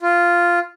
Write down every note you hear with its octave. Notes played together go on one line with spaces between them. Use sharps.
F4